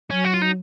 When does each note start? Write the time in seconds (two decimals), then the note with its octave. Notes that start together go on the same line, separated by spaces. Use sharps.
0.10 F#3 C#4
0.24 F#4
0.34 F4
0.41 D#4